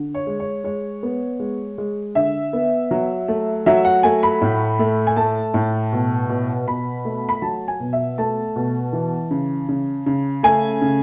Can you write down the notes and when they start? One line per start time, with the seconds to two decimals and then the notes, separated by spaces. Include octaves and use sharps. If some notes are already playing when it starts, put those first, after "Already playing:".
Already playing: D3
0.14 C#5
0.27 G#3
0.40 C#5
0.64 G#3 C#5
1.03 B3
1.40 G#3
1.78 G#3
2.15 D3 E5
2.53 B3
2.91 F#3
3.28 A3
3.66 F#3 E5
3.85 F#5
4.03 A3 G#5
4.23 B5
4.41 A2
4.79 A3
5.07 G#5
5.17 A3 A5
5.54 A2
5.92 B2
6.30 B2
6.67 B2 B5
7.05 A3
7.29 B5
7.42 F#3 A5
7.68 G#5
7.80 B2
7.93 E5
8.18 A3 A5
8.56 B2
8.93 E3
9.31 C#3
9.69 C#3
10.06 C#3
10.43 A3 G#5
10.82 C#3